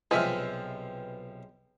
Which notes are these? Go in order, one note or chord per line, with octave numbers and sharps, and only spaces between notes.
B1 C3 F3 G#3 B4 E5 G5 F6